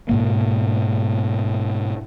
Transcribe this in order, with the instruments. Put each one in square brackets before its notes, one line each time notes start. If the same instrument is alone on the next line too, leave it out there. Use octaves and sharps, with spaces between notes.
[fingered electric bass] G#2 B2 A#3